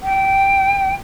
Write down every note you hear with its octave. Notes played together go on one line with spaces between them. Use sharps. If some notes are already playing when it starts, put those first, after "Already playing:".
G5